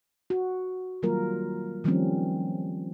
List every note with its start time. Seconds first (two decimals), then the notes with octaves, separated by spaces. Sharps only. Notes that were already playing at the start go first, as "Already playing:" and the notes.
0.30 F#4
1.03 D#3 F#3 G3 A#3 F4 A#4
1.84 D#3 F3 G3 A#3 C4 C#4